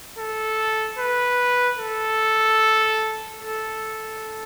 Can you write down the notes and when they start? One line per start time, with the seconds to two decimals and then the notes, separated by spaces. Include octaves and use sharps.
0.18 A4
0.98 B4
1.78 A4
3.39 A4